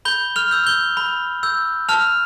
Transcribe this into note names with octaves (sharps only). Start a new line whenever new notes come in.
B5 G6 G7
F6 F7
E6 G6
G6 G7
B5
E6 G6
A5 F6 F7